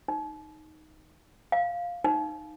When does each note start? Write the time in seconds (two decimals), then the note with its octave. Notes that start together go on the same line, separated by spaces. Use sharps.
0.08 D#4
1.52 F5
2.04 D#4